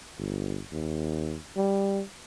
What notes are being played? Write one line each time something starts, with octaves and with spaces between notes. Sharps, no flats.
G1
D#2
G3